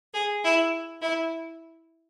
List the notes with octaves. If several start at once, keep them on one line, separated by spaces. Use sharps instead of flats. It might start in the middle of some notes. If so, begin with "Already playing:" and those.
G#4
E4
E4